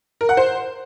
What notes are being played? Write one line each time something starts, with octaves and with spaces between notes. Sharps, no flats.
A#4
F#5
C5